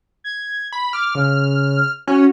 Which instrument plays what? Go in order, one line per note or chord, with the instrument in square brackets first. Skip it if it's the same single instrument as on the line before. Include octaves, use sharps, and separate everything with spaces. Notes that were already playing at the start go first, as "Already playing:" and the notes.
[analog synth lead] G#6
[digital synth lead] B5
[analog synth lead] D6 [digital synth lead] F6
[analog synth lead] C#3
[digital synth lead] C#4 [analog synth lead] F#4